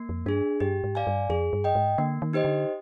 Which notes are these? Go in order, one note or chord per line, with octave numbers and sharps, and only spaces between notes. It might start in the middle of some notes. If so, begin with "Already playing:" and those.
Already playing: A#3
F2
G2 D4 G#4
G2 G4
G#2
D5 F5 G#5
G2
F2 G#4
G2
D#5 G5
G#2
D3 A#3
D#3
D#4 G4 C5 D#5
D3